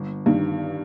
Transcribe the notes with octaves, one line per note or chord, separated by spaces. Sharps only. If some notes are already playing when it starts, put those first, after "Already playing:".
Already playing: G1
G2 D#3